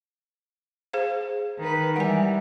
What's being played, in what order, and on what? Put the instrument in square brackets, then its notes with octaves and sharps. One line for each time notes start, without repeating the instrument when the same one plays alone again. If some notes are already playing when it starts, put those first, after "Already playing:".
[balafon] G#4 C5 F5
[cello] D#3 B4
[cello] E3 G3 [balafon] F#5 G#5